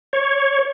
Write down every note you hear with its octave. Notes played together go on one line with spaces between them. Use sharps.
C#5